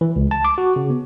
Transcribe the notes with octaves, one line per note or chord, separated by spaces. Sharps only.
E3
C#2
A5
D6
F#4
C#3
B3